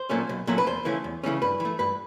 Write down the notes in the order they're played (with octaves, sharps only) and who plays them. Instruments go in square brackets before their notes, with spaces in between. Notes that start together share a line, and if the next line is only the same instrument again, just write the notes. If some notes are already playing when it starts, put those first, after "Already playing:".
Already playing: [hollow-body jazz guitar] C5
A#2 F#3 A3 C#4
B1
A#2 F#3 A3 C#4
B4
E2 C5
C#3 E3 A3 C#4
E2
C#3 E3 A3 C#4
G2 B4
E3
A3
G2 B4